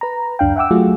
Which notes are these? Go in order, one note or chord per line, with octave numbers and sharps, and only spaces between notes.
B4 A#5
C#2 F#2 D4 F5 G5
E5 F#5 G5 D6 E6
F#3 A3 F4 F#4 G#4